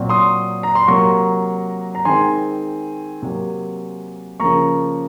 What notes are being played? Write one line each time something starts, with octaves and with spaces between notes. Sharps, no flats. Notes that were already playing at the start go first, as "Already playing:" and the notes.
Already playing: A#2 F#3 C4
C6 D#6
A#5
C6
C3 F#3 A#3 A#5 C#6
A#5
D#3 G#3 C4 G#5 C6
C3 F#3 A#3
C#3 F3 A#3 A#5 C#6